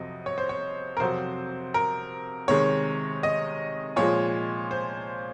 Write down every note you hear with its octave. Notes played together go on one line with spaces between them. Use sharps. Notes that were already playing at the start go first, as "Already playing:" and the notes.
Already playing: F2 C3 F#3 D#5
C#5
C5
C#5
A#4
F2 C3 F#3 C5
A#4
C3 D#3 G#3 C#5
D#5
A#2 F3 G#3 C#5
C5